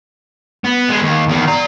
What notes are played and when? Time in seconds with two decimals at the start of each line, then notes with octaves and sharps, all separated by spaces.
0.65 B3
0.90 G#3 B3
1.02 D#2
1.28 E2 D#3
1.48 D5 A#5